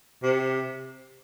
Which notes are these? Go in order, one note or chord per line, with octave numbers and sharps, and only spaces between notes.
C3